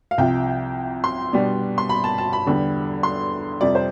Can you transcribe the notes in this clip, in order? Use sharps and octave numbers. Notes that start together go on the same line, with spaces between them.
F5
C2 C3 F3 G5
C6
B2 G3 B3 D4
C6
B5
A5
A5
B5
E2 D3 G3
C6
F2 C3 G3 D5
C5